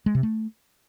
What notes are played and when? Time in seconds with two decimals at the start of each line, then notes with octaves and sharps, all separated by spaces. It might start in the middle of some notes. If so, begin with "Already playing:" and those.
0.06 G#3
0.15 C3
0.23 A3